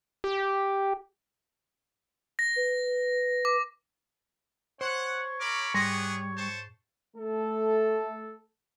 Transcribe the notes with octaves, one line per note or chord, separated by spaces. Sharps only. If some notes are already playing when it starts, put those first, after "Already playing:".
G4
A#6
B4
D6
C5 C#5 F#5
A#4 B5 D6
G#2 G3 B3 G#4 F#5 A#6
C5 A5 C#6
A3 A4